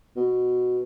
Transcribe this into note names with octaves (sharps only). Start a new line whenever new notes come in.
B2